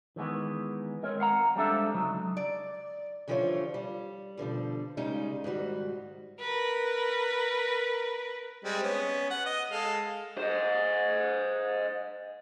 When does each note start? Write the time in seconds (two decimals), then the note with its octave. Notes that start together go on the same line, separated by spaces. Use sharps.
0.16 D#3 E3 G#3 B3
1.03 G#3 C4 A#4 C#5
1.20 F5 F#5 A#5
1.56 G3 G#3 C4 D4 A4 E5
1.94 C#2 F#3 D#4
2.37 D5
3.28 D3 E3 F3 G3 F4 C#5
3.74 G3
4.37 B2 D3 F3 G3
4.97 C#3 G3 G#3 D#4
5.44 G#2 D#3 G3 F#4
6.38 A#4 B4
8.65 G3 G#3 C4
8.83 B3 C#4
9.30 F#5
9.46 D#5
9.71 G#3 A4 F5
10.38 C5 D#5